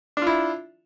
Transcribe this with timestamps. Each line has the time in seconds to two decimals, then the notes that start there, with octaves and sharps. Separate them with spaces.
0.17 D4
0.22 F4
0.27 E4